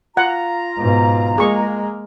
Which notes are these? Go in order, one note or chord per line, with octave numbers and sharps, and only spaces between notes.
F4 F#5 A#5
G#2 B2
G#3 A#3 G#4 C#6